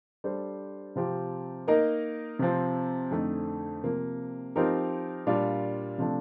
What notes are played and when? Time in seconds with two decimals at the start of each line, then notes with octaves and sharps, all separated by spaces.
0.24 G3 D4 A4 C5
0.96 C3 F3 C4 G4
1.68 A#3 D#4 A#4 D#5
2.39 C3 F3 C4
3.11 F2 D3 A3 C4 D#4
3.83 C3 F3 A#3
4.56 F3 C4 D#4 G4 A#4
5.27 A#2 G3 D4 F4
5.98 C3 F3 A3 D4